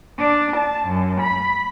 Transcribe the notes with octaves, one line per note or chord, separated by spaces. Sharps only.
D4
A5
F#2
B5